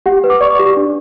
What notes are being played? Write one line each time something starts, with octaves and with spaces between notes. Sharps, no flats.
G4 F#5
B4
D6
D5 C#6
G4
D4